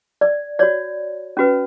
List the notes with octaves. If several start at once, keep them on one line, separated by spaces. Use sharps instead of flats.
D5
F#4 C#5 D5
C#4 F#4 B4